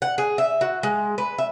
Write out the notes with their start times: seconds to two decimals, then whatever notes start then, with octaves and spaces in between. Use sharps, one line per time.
0.02 F#5
0.18 G#4
0.38 E5
0.61 F#4
0.83 G#3
1.18 B4
1.38 E5